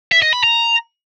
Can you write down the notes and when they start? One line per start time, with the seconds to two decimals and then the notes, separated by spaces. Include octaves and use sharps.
0.12 E5
0.22 D#5
0.33 B5
0.43 A#5